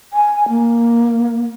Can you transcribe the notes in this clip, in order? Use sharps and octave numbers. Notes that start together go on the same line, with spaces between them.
G#5
A#3